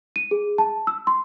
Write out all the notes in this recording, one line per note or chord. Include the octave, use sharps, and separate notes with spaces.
D#7
G#4
A5
E6
C6